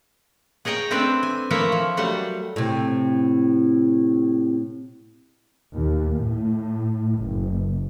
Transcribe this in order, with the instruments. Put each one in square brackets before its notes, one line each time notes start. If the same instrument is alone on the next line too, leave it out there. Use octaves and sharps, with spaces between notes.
[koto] G#4 C#5 D#5 G5 A#5
A3 C4 D4 B4 D5 E5
G#5
F3 A3 A#3 E4 C#5 E5
F3
F#3 G3 A3 F#5
[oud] A2 C3
[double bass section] D#2
A2
F#1